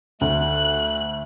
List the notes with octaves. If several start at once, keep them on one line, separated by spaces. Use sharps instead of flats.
D2 A3 F#6